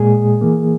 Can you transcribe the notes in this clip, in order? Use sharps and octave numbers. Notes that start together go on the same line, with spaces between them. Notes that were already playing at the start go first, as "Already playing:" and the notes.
Already playing: A#2 G#3 G#4
E3 A#3